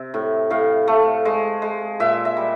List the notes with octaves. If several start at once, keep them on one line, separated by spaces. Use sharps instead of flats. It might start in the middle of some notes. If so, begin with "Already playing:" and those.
Already playing: C3 E5
A2
A2 F5
A3
G#3
G#3
A#2 E5
E5
G3